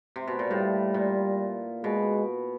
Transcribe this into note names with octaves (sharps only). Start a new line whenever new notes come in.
C3
B2
A#2
A2 G3
A#2
B2 G#3